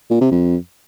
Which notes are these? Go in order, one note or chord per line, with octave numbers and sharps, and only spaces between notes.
A#2
C3
F2